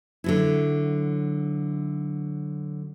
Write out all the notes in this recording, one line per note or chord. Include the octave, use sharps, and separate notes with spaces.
D3 F#3 E4